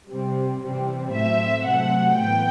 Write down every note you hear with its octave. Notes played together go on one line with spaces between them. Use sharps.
C3 G3 C4
C3 E3 G3 C4
A2 F#3 A3 C4 E5
C3 F#3 A3 C4 F#5
A2 E3 B3 G5